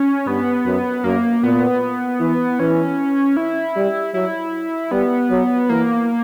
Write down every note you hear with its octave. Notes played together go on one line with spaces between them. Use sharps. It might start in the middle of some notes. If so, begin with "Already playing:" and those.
Already playing: C#4
G2 B3
F#2
F#2 A#3
A#2 B3
E3
E3 C#4
E4
G3
F#3 E4
G3 B3
F#3
E3 A#3